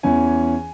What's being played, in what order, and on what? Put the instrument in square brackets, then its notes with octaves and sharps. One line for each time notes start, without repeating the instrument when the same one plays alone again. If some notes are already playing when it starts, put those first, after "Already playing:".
[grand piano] E2 E3 C#4 G#5